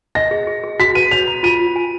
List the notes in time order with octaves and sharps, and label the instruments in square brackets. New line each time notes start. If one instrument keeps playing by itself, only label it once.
[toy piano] D#5 [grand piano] A#6
[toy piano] G#4
G#4
G#4
[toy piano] F#4 [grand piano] B6
[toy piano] B4 [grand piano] D#7
[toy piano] C#5 [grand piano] F7
[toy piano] A#5
[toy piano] F4 [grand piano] D#7
[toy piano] F4
G#5